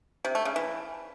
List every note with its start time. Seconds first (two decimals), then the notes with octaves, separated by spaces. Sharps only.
0.25 C3
0.35 A3
0.45 C#3
0.56 E3